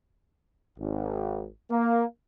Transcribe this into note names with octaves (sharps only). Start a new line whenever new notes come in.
G#1
A#3